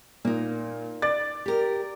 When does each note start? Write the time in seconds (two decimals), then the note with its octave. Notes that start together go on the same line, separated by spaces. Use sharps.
0.25 A#2 A#3 D#4
1.02 D5 A6
1.46 G4 A#4